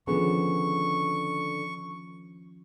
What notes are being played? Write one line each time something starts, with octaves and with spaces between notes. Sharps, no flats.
D3 D#3 F3 B3 C#4 G#4 C#6